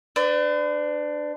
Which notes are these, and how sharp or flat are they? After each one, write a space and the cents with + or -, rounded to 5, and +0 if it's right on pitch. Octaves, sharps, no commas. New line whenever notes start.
D4 +10 B4 +45